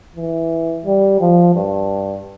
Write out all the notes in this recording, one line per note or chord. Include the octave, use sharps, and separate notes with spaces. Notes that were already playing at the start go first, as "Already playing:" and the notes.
E3
G3
F3
G2